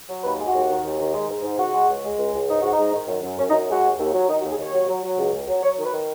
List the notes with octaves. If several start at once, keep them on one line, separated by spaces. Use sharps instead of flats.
F#3
D#2 B4
G#3
F#4
D#2
D#3
D#2
D#3
G#3
G#2
G#2
C#2 F#4
G#3
C#2
G#3
C#2
C#2
G#2 D#4
G#2 F#4
D#4
G#2
D#3
F#2
F#2
F#2 C#4
D#4
F#2
G#3 F#4
D#2
D#2
F#3
D#3 D#4
F#4
D#2
G#4
D#2 C#5
F#3
F#3
F#3
C#2
C#2
F#3
F#3 C#5
D#3
B4
D#3